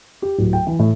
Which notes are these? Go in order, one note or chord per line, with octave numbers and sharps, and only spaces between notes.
G4
D1
G5
E3
A2